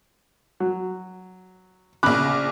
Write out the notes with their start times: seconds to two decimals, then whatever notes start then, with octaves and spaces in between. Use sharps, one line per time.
0.60 F#3
2.03 A#1 C#3 B5 D6 F#6